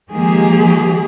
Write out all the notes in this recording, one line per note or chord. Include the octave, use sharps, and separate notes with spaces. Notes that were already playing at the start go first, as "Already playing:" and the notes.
D#3 F3 G#3 A#3 G4 G#4